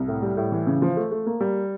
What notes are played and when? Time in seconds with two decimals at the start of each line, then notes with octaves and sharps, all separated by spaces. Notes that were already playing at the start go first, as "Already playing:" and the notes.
Already playing: C2
0.08 A2
0.22 G3
0.37 A2
0.52 E3
0.67 C#3
0.82 F3
0.97 A3
1.11 A3
1.26 A#3
1.40 G3